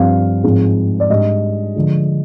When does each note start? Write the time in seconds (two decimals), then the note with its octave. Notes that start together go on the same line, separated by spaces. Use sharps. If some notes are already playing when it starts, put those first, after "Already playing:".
Already playing: G2 F3 C4 F5
0.44 G#2 F3 G#3 C4
1.00 D5
1.10 G#2 G3 D4 D#5
1.76 D3 F3 G#3